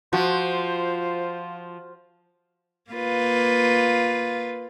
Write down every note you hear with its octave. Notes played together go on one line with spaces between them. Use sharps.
F3 F4 F#4 C5
A#3 F4 B4